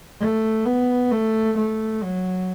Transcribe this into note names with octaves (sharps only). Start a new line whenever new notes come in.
A3
B3
A3
A3
F#3